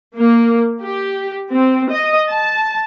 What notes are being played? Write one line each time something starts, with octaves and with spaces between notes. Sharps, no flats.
A#3
G4
C4
D#5
A5